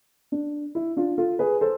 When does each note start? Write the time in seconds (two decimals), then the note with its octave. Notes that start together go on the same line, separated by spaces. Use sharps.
0.32 D4
0.75 E4
0.96 D4 F4
1.18 F4 A4
1.39 G#4 B4
1.61 A4 C5